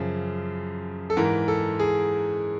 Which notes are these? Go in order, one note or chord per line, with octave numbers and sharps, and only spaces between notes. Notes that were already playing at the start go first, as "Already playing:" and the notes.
Already playing: F#2 C#3 F3
A4
G#2 E3 A#4
A4
G#4